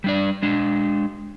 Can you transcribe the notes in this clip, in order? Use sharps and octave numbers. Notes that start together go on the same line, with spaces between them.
G3 D4 D5
G#3 D4